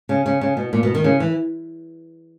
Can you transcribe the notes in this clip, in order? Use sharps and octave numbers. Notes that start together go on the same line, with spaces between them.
C#3
C#3
C#3
B2
A#2
B2
D#3
C#3
E3